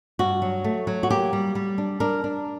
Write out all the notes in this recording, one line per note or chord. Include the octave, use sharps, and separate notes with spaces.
G2 F#4
F#3
A3
F#3
F#4
A#3 G4
G3
G3
D4
D4 A#4
D4